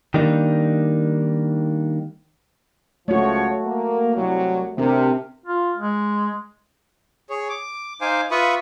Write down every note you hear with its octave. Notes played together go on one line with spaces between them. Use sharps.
D#3 G3 A#3 D4 D#4
C#2 F3 A3 F#4 C#5
A#3
C2 F#3
C3 C4 D4 A#4
F4
G#3
G#4 C#5
D6
D#4 C5 F5 G#5 D6
F4 B4 E5 B5 C#6 D#6